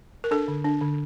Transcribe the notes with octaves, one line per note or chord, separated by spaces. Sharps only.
A#4
D4 A4
D3
D4
D3